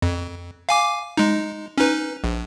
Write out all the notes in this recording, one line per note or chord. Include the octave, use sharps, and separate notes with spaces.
F2
F5 G#5 D6
G#3 D#4
C#4 D#4 B4
A#1